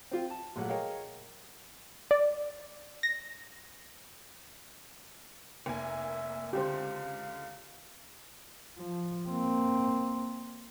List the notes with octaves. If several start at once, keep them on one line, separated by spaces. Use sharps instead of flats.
C4 F4 G5
A5
A#1 F#3 A3 F#5
G#4 A#4 C#5 D#5 F5 G5
D5
A#6
F1 A#3 E5 G#5
C#2 D3 G4 C5 F5
F3
A#3 C4